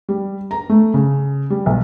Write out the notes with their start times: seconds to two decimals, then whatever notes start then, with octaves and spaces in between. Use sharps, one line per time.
0.09 G3
0.51 A#5
0.69 A3
0.94 C#3
1.50 G3
1.66 B1